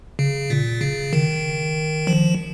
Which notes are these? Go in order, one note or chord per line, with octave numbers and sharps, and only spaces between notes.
C#3
A#2
C#3
D#3
F3